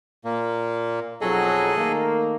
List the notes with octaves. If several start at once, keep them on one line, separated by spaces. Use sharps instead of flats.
A#2 A#3
B1 F2 F#3 G#4 A4 D#5
D#3 A3 A#3